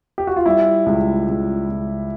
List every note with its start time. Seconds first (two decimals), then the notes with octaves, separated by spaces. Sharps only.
0.18 G4
0.27 F#4
0.36 F4
0.46 G3 E4
0.86 C#2
1.28 C#2
1.69 C#2